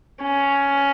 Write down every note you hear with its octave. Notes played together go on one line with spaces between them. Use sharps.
C#4